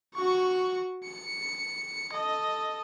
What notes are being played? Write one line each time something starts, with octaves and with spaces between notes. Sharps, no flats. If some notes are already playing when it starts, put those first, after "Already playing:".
F#4 C#6
C#7
A4 D#5